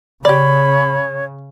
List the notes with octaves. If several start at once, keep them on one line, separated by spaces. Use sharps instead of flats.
C#3 G4 C#5 D5 B5